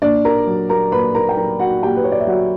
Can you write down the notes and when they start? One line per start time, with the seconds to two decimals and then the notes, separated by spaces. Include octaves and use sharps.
0.02 A#2 D4 D5
0.25 A#4 A#5
0.47 F#3
0.69 A#4 A#5
0.92 A#2 B4 B5
1.15 A#4 A#5
1.29 G5
1.37 F#3 A#4 A#5
1.59 F#4 F#5
1.82 A#2 G4 G5
1.96 B4
2.04 C#5
2.12 D5
2.20 E5
2.27 F#3 F#4 F#5